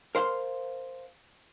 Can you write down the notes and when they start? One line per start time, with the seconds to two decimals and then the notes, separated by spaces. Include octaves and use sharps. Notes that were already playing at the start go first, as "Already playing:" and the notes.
0.15 A#4 C5 F5 B5 C6